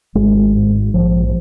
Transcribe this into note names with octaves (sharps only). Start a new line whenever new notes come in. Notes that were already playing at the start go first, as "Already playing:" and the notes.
G#1 G#3
G#2
A#1 F3